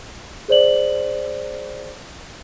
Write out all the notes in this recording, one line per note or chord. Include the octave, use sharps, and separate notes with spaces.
G#4 C5 D5 F#7